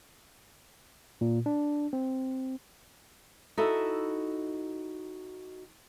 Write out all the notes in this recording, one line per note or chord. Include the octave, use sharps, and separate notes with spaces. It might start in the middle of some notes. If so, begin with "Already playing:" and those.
A#2
D4
C4
D#4 E4 F#4 A4 E5